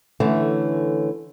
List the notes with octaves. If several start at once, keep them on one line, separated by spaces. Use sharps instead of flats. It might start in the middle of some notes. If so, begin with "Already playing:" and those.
D3 E3 A3 C#4